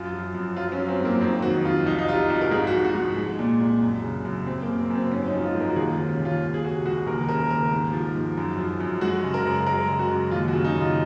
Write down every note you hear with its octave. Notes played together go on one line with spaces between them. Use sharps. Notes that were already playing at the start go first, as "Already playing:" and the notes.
Already playing: F#2 F4
F3
F#2
F#3 F4
C#4
F#3
C4
G#2
A#3
F2 C4
D#3 F#4
F2 F4
C2 D#4
D#4
C3 F4
C2 F#4
A#4
G#2 G#4
F#4
F3
F#4
G#2
G#3
A#2
C2
F#2
C#3
F#2
F#2 C4
A#3
C#3
C4
F#2
C4
G#2 C#4
C#4
D#4
F3
F4
G#2
A#4
F#4
D#2 G#4
F4
D#3
C#4
D#2
F4
C#2
G#4
C3 F#4
C#2 F#4
D#2 A#4
C#3 A#4
D#2 A#4
G#2
F3
G#2
F#2
F3
F#2
G#3 F#4
C#3
A#4
F#2
G#3 A#4
C#3
F#4
F#2
D#2 F4
F#4
C#3
D#4
D#2
F4